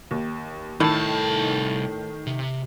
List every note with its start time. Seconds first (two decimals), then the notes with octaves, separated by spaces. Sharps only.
0.11 D#2
0.80 C2 A2 D#3 A5
2.27 C3